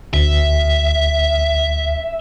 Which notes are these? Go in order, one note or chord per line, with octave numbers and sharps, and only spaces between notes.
D2 E5